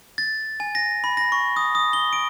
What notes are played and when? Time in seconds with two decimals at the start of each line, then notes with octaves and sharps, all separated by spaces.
0.18 A6
0.60 G#5
0.75 A#6
1.04 B5
1.17 A#6
1.32 C#6
1.56 D#6
1.75 D#6
1.93 G7
2.13 D7